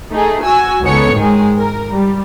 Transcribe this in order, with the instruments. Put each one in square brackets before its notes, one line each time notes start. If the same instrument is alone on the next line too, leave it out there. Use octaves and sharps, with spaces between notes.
[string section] A3 D#4 G#4
F#4 G#5 E6
C#2 B3 D#4 A4 C#5 C#7
G#2 D#3 G#3 G#4
A#4
G3